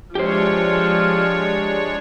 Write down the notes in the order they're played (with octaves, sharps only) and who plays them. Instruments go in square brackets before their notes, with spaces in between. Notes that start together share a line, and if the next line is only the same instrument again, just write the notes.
[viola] F3 [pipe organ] G#3 D4 C#5 [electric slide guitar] G4 C5